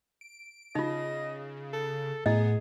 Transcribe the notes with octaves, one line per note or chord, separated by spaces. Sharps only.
D7
C#3 D#4 F4 D#5
A4
A2 B3 E4 G#4 D#5